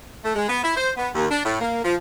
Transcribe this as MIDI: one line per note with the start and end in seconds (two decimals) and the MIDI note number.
0.23 0.34 57
0.36 0.48 56
0.49 0.63 59
0.64 0.75 64
0.76 0.90 72
0.97 1.10 59
1.15 1.26 39
1.31 1.43 62
1.45 1.59 45
1.61 1.80 58
1.84 1.94 53